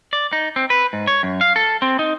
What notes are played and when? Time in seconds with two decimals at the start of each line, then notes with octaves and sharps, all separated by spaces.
0.13 D5
0.33 D#4
0.56 C4
0.70 B4
0.93 G#2
1.07 C#5
1.23 F#2
1.41 F5
1.56 A4
1.82 C4
1.99 D#4